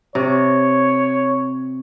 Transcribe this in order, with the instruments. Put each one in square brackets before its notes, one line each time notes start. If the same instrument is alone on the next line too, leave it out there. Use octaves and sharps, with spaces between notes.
[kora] C3 [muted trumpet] C#5